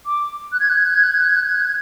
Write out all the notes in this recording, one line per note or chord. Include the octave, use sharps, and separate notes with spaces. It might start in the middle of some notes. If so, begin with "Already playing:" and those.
D6
F#6
G#6
F#6
G#6
F#6
G#6
F#6
G#6
F#6
G#6
F#6
G#6
F#6
G#6